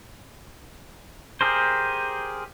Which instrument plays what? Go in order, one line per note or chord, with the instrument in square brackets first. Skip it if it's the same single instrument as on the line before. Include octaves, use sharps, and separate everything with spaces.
[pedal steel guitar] G4 G#4 A#4 C5